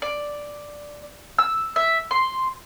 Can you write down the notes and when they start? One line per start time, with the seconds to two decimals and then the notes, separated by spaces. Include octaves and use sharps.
0.02 D5
1.39 E6
1.76 E5
2.11 C6